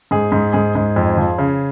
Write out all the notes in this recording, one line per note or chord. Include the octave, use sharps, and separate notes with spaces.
G#2 G#4
G#2
G#2 G#4
G#2
F2
F3
C#3